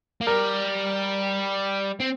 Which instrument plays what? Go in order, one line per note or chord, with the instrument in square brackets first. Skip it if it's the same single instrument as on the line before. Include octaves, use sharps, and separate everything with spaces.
[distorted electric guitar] A#3
[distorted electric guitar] G3 [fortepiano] A#4
[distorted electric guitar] C4